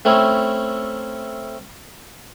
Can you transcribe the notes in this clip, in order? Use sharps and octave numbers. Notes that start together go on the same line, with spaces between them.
A3 C4 C#4 E4